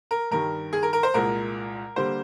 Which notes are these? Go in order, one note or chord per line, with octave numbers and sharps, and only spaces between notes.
A#4
G2 D#3 G3 A#4
G#4
A#4
A#4
C5
C2 A#2 G#3 A#4
D3 G3 A#3 C5